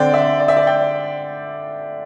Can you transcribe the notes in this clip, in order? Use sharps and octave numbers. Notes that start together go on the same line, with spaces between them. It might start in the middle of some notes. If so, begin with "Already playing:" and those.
Already playing: D3 C4 D5 G5
E5
D5
E5
D5
D5 G5